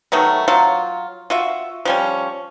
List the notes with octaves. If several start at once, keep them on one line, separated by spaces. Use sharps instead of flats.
D#3 F#3 A3 B3
F#3 F4
F4 F#4 E5
F3 G3 C#4